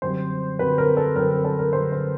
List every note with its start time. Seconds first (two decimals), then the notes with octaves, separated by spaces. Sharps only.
0.02 F#2 D3 G3 C4 C5
0.59 F#2 D3 G3 C4 B4
0.78 A#4
0.97 A4
1.15 F#2 D3 G3 C4 A#4
1.31 A#4
1.44 A4
1.59 A#4
1.73 F#2 D3 G3 C4 C5
1.92 C5